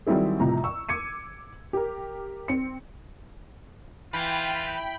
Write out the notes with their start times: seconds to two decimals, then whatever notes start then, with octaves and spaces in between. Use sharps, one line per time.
0.07 D#3 F#3 G3 C4 E4 G#4
0.40 A1 C3 F3 A#5
0.64 C#6 E6
0.89 D6 G#6 C#7 D#7
1.73 G4 A#4
2.48 C4 C#7
4.13 E3 F4 G5 B5